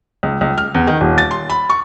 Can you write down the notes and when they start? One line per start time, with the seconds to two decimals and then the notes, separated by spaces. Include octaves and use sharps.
0.23 C#2
0.41 C#2
0.58 F6
0.74 E2
0.87 D#3
1.01 D#1
1.18 A6
1.31 C6
1.50 B5
1.70 C#6